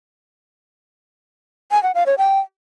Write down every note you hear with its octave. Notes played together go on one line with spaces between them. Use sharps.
G#5
F#5
F5
C#5
G5